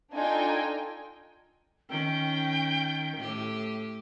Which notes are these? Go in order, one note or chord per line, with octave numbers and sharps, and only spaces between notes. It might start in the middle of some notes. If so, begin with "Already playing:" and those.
D4 D#4 F4 A4 G5 G#5
D#3 C#4 G5
A2 G4